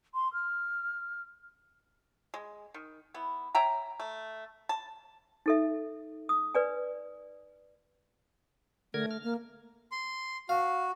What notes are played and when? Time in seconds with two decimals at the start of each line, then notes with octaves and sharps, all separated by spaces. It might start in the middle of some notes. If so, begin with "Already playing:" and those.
0.14 C6
0.33 F6
2.34 G#3
2.74 D#3
3.14 B3 E4
3.55 C#5 E5 G5 A#5
4.00 A3
4.69 A5
5.46 D#4 A4 E5
6.29 D#6
6.55 B4 D5 G#5
8.94 D3 A3 A#4 G#6
9.11 F6
9.24 A#3
9.92 C6
10.49 F#4 F5